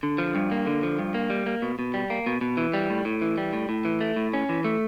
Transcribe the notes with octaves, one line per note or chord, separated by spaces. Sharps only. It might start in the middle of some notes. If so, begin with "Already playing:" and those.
D3
F3
G2
A#3
D3
F3
G2
A#3
G3
A#3
B2
B2
G3
A#3
B2
B2
E3
G3
A2
A2
E3
G3
A2
A2
E3
A3
A2
C#4
E3
A3